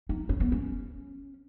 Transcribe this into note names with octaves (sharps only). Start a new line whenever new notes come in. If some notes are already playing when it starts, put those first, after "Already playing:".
D#4
C#4
B3
C#4